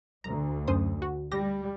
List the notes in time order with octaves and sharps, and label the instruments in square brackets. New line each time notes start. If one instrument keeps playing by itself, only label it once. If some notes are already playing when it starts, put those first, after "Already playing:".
[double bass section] D2 [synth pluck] A#5
[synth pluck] F#2 C5 D#6
F#4
[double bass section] G3 [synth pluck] G4 A#6